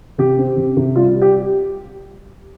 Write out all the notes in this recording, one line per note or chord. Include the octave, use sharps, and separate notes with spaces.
C3 G4
C4
C3
C3
G3 F4
G3
G4